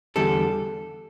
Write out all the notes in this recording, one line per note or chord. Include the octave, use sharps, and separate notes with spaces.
E2 D3 G3 A4